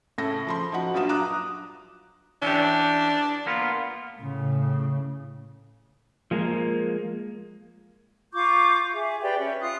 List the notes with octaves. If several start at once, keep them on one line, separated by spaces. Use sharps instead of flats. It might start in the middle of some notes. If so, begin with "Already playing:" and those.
A2 C#3 A4 A#6
F3 B5 C6
F3 D#4 F#4 F#5
A#1 G2 F#3 F4 D#6 E7
A#5 D6 D#6 F#6
E3 C#4 D4 G4
A#3 B3 F4
A2 C#3
F3 G#3 A#3
F4 C#6 D6 G6
G#4 E5
G4 B4 D5 G5
C#4 E5
F4 D#6 F#6